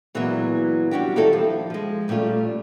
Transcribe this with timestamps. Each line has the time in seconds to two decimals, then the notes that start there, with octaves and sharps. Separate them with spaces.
0.15 A#2 E3 F#3 G#3 A#3 B3
0.91 F#3 G3 C#4 D4 F#4 G4
1.16 D#3 G3 E4 F4 A4
1.33 F3
1.70 F3 G#3
2.08 A#2 G3 A3 C#4 F4